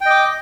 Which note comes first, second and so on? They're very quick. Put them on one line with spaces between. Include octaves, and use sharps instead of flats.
G5 D#5 D6